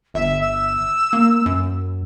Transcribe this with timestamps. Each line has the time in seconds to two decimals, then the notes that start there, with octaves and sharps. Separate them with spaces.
0.14 G1 E5
0.41 E6
1.13 A#3
1.46 F#2